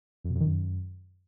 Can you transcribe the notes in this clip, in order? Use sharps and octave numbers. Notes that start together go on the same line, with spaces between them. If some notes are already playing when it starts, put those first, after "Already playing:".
F2
B2
F2
D#3
F#2